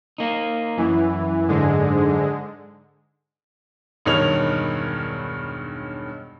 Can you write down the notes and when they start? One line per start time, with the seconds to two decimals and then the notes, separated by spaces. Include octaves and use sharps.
0.18 A#3 D#4
0.78 F#2 E3
1.48 G#2 D3 G#3
4.06 E1 G2 D#3 C#5 F7